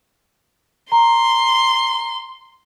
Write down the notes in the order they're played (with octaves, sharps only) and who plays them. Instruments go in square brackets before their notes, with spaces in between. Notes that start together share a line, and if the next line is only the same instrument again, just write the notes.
[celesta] A#5 [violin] C6